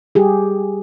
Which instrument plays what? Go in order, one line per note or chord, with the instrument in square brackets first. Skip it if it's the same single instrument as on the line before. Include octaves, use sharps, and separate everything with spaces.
[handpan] G3 G4 G#4